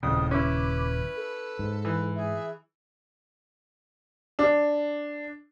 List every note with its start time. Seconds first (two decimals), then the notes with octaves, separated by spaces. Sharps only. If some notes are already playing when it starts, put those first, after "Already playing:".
0.03 D#1 F2 A2 C#3 D#6
0.31 C#4 E4 B4 D6
1.16 A4
1.59 G#2
1.85 E3
2.16 G#4 E5
4.39 D4